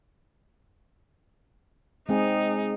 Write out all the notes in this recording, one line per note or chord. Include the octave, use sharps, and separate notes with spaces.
G#3 C4 D#4 G#4